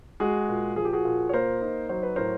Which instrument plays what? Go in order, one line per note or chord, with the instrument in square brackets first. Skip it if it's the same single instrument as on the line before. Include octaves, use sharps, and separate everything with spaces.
[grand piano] G#3 F#4 G#4
A#2
F3 G#4
G4
F#4 G#4
A#2
C#5
A#3 A#4 C5
D#4
F#3 C5
B4
A2 A#4 C5